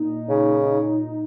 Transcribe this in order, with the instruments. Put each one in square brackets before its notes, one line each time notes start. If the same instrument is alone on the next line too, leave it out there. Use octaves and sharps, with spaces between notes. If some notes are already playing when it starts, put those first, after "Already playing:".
Already playing: [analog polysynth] A#2 D#4
[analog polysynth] A#2 [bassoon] C#3
[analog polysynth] A#2